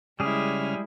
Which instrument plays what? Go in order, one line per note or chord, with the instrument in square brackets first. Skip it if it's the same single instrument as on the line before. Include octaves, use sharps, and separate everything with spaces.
[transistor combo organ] C#3 F6 [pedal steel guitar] G3 G#4 [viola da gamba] G#3 E4